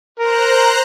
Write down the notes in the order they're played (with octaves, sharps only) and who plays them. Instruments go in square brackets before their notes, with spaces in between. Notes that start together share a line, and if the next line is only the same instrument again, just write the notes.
[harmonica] A#4 [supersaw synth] C5 A#5 F#6